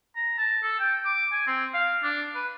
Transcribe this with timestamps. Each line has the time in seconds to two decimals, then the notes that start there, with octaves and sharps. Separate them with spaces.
0.16 A#5
0.38 A5
0.63 A4
0.79 G5
1.05 D6
1.32 G#5
1.47 C4
1.74 F5
2.02 D4
2.35 B4